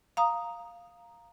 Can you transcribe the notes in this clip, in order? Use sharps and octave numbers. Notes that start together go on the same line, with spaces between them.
F5 A#5 D#6